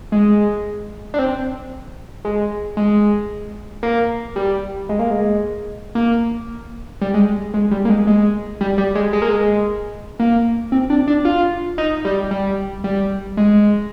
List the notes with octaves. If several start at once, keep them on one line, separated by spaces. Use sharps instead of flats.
G#3
D4
C4
G#3
G#3
A#3
G3
G#3
A#3
G#3
A#3
G3
G#3
G#3
G3
A#3
G#3
G#3
G3
G3
G#3
G#3
A#3
G#3
A#3
C4
D4
D4
F4
D#4
G3
G3
G3
G#3